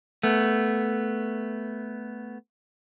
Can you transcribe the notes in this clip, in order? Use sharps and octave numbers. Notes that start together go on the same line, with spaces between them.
A3 B3